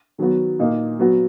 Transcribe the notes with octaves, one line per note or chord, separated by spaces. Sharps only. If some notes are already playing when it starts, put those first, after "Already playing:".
D#3 F#3 B3 F#4
A#2 A#3 D#4
F#3 B3 F#4